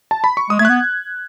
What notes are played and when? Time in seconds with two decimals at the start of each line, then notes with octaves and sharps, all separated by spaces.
0.11 A5
0.24 B5
0.37 C#6
0.50 G#3 D#6
0.59 A3 G#6
0.65 F#6
0.69 B3